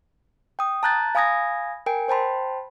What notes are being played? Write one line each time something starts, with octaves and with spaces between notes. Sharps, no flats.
G5 D#6
A5 A#5 F#6 G6 A6
F5 G#5 B5 D#6 G#6 A#6
A#4 G5 G#5 D7
C5 G5 A5 B5 C6